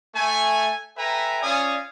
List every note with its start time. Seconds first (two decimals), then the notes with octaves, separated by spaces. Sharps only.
0.15 A3 G#5
0.98 A4 B4 E5 G5 G#5 A#5
1.43 C#4 F4 D5 F5 G#5 D#6